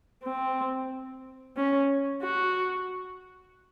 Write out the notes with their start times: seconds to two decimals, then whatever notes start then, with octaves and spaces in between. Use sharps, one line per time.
0.24 C4
1.57 C#4
2.23 F#4